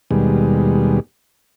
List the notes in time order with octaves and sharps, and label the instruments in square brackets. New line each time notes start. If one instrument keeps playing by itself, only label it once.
[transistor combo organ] D#2 B2 G3 G#3